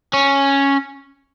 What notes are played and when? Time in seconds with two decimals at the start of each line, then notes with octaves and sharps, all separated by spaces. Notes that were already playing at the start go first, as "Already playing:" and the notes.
0.13 C#4